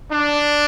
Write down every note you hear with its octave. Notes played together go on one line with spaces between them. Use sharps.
D4